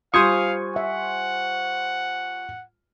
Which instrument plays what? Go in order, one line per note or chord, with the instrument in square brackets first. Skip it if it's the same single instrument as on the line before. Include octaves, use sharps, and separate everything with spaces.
[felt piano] G3 F4 [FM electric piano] C5 G#5 C#6 [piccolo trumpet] F5 [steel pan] D#6
[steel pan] E5 [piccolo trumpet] F#5